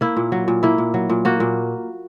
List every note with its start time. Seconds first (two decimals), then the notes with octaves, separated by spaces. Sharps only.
0.01 A#3 E4
0.17 A#2
0.32 F#3
0.48 A#2
0.63 A#3 E4
0.78 A#2
0.94 F#3
1.10 A#2
1.25 A#3 F#4
1.40 A#2